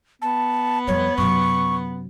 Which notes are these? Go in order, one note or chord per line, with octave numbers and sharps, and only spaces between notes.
B3 A5
F2 G3 C#5
F#2 C3 C#6